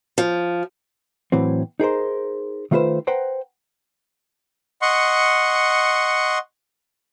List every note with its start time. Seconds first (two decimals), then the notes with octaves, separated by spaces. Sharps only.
0.18 F3
1.32 A2 E3 F#3 C4
1.80 D#4 G#4 A#4 C5
2.71 D#3 A3 F4 G#4 B4 C5
3.07 B4 C5 F#5 G5 A#5
4.82 D#5 F#5 C6 C#6